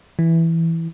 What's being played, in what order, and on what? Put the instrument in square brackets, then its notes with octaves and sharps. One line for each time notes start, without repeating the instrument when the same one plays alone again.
[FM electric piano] E3